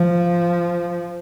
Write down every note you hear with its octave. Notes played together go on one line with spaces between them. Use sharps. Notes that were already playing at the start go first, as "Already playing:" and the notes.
Already playing: F3